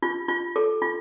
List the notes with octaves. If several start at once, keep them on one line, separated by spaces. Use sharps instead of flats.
F4
F4
A4
F4